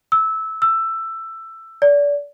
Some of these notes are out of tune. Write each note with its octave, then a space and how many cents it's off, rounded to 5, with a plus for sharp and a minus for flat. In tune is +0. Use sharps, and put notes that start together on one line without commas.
E6 -15
E6 +10
D5 -30